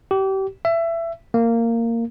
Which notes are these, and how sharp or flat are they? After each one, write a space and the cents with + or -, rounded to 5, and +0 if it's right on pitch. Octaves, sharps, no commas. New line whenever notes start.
G4 -30
E5 +20
A#3 -15